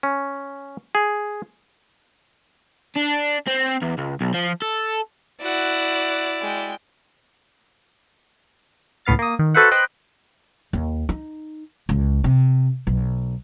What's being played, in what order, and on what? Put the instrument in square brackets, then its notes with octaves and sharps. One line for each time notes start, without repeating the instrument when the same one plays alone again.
[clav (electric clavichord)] C#4
G#4
[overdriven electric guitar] D4
C4
E2
C#2
B1
F3
A4
[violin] E4 D5 [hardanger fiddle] F#4 F#5
[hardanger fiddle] G#3 G5
[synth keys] C#2 A2 B3 F5 A6
A#3 D#6
D#3
F#4 A4 B4 C5 E5 F#5
B4 C5 D#5 G5 B5 F#6
[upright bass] D#2
D#4
C#2
C3
B1